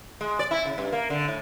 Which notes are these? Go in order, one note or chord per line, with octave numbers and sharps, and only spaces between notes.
G#3
D5
E4
C#3
G2
A#3
D3
A2